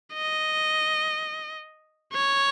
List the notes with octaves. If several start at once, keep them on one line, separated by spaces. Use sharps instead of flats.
D#5
C#5